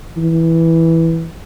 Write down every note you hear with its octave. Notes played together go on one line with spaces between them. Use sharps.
E3